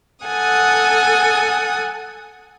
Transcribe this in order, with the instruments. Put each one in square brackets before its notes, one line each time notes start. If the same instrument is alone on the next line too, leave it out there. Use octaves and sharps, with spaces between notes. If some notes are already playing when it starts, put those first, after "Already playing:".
[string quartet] A4 F#5 G#5 D#6